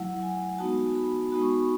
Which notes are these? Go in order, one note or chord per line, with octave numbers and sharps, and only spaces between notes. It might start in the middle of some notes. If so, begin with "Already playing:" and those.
Already playing: F#3 A3 E4 F#5
F#5
G#5
G#3 B3 D#4 F#4 A5
B5
G#3 B3 D#4 F#4 B5
C#6
B5